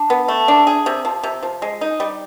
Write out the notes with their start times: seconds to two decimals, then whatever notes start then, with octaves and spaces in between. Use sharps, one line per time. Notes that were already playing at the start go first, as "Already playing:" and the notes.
Already playing: D4
0.10 B3
0.28 A3
0.48 D4
0.67 G#4
0.86 C3
1.05 F3
1.24 C3
1.43 F3
1.62 G#3
1.81 D#4
2.00 G3